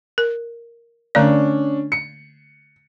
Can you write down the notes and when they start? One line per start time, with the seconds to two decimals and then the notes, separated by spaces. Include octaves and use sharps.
0.18 A#4
1.15 D3 A3 C#4 D4 D5
1.92 C#7